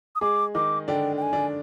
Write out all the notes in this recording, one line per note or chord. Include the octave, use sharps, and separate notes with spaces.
D#6
G#3 G#4 D6
D#3 D#4 D6
D3 D4 G5
G5
G#5
D3 D4